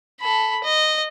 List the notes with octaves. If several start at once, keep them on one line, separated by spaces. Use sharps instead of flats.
A4 B5
D#5